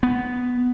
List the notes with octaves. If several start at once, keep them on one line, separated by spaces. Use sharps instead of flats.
B3